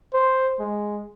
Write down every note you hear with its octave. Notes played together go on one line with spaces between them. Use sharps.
C5
G#3